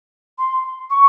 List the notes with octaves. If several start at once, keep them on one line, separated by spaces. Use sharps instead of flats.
C6
C#6